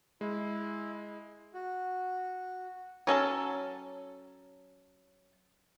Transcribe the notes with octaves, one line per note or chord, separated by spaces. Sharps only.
G#3 E4
F#4
F#3 C#4 A4 A5